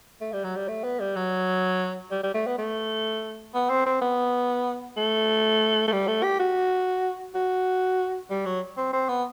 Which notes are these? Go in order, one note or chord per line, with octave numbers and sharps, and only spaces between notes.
A3
G3
F#3
G3
A3
B3
G3
F#3
G3
G3
A3
B3
A3
B3
C4
C4
B3
A3
A3
G3
A3
G4
F#4
F#4
G3
F#3
C4
C4
B3